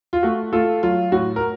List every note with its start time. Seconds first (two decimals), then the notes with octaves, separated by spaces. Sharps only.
0.13 F4
0.23 A3 F#4
0.53 A3 F4 A4
0.83 F#3 F4
1.12 A2 F#4
1.36 A#4